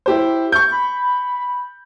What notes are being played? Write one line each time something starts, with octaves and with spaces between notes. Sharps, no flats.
E4 G4 C5
C#6 G6
B5